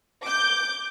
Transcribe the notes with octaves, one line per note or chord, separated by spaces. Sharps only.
D6 G6